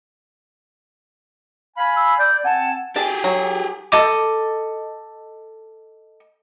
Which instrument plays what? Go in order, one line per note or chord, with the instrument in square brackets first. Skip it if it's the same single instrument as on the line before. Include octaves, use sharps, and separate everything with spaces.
[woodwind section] F5 G#5 B5
[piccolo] E6
[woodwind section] D5 [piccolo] G6
[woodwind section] C4 G#5 A5 [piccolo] F#5
[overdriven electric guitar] G4 G#4 [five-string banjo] A5
[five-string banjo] F#3
[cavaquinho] A4 D#5 D6